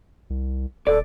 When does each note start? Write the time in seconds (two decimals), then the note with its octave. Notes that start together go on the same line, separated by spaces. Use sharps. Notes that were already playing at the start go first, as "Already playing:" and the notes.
0.30 C2
0.87 D#1 A4 D5